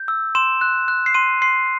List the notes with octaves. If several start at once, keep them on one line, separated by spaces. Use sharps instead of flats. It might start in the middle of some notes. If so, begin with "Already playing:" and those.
Already playing: G6
E6
C6 E7
F#6
F#6
C7
C6 D#7
C6 C7